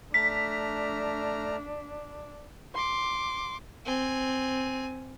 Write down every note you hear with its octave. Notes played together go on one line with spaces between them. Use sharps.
A3 D4 A#5 F6 B6
C6 D6
C4 G#5